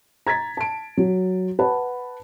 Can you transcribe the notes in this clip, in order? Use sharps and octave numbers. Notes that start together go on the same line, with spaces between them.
A#5 G#6 A6 B6
A5 D7
F#3
B4 F#5 A5